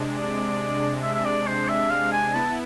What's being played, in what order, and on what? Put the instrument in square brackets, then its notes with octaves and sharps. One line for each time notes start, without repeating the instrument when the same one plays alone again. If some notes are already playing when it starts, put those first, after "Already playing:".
Already playing: [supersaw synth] C3 G#3 D4
[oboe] D5
E5
E5
D5
C5
E5
F5
G#5
[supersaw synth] B3 E4 [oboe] A5